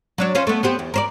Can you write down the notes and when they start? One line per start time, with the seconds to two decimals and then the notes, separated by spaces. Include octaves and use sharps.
0.18 F#3 D4 C#5
0.35 C#4 F4 C5
0.47 A3 B3
0.63 B3 C4 G4
0.79 E2
0.94 A#4 C5 D5